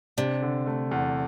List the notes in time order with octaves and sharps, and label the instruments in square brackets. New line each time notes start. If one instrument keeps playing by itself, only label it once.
[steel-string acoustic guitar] C3 [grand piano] D4
[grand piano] D3
A3
E2